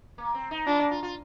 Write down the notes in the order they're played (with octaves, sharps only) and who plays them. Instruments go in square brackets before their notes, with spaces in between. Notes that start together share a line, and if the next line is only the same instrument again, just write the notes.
[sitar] A#3
C4
D#4
[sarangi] D4 [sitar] F4
[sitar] A#3
F4
F4